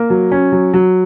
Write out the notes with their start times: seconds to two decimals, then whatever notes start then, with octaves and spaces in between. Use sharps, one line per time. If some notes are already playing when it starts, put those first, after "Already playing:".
Already playing: A#3
0.10 F#3
0.32 C#4
0.52 F#3
0.74 F#3